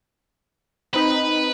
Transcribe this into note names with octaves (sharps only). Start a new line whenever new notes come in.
C4 D#4 B4 B5